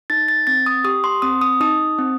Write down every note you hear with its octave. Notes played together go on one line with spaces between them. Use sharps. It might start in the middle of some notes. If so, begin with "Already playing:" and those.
D#4 A6
A6
C4 A6
D#6
G4 D#6
C6
C4 D#6
D#6
D#4 D#6
C4